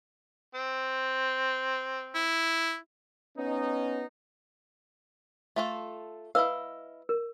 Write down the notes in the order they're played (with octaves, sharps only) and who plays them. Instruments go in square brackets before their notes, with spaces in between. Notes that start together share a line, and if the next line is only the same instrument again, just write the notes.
[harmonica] C4
[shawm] E4
[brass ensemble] B3 C#4 D#4
[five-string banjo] A3 F4 A4
[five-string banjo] E4 D#5 F5 [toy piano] B4 E6
[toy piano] A#4